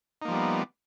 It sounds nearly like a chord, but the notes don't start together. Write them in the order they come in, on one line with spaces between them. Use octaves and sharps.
D#4 A#3 F3 G3 B3